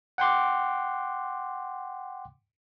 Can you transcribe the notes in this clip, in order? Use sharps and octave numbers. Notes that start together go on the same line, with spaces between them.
F#5 G5 C6 D6